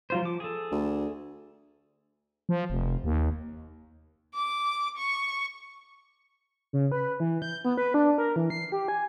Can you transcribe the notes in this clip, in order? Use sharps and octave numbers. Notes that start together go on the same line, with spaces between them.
F#3 F4 C5
F3 D6
G#4 A4
D2
F3
F1
D#2
D6
C#6
C#3
B4
E3
G6
B3
B4
D4
A#4
E3
C7
G4
G#5